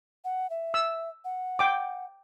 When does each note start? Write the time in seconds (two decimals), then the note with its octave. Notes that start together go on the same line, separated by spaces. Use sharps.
0.25 F#5
0.50 E5
0.74 E6
1.25 F#5
1.59 G5 D6